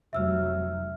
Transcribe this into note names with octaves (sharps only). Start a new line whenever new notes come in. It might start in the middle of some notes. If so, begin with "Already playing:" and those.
F1 F#3 E5 E6 F6